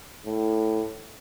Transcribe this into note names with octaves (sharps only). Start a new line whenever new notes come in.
A2